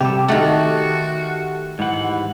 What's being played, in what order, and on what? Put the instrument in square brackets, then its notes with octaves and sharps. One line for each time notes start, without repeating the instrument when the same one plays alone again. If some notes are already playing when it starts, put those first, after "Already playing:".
[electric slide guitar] C3 G3 A4 [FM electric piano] G4
[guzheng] D#3 A3 [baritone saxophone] F#4 [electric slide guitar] A4 F#5
[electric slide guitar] G#2 F#5 [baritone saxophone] E3